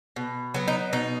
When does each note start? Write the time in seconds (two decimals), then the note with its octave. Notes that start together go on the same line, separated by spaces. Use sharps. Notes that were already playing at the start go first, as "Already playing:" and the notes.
0.16 B2
0.54 F#3 B3
0.68 D#4
0.93 B2 D#4